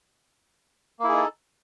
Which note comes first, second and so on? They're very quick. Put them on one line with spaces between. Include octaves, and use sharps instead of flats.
A#3 E4 G#4 D#4 A4